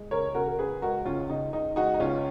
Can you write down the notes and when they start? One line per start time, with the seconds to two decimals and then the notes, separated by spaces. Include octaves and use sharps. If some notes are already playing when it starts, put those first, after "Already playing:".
Already playing: G#3
0.11 C#2 A#4 C#5
0.34 C#3 F#4 A#4
0.48 A#4
0.59 C#2 G#4 B4
0.82 G#3 F#4 A#4
1.05 C#2 C#4 F4
1.29 C#3 D#4
1.53 C#2 D#4
1.76 G#3 D#4 F#4
1.94 D#4
2.00 C#2 C#4 F4